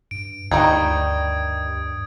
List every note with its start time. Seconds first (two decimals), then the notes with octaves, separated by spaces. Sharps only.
0.11 G2 D7
0.51 D2 G2 D#3 G3 D#4 D#6 G#6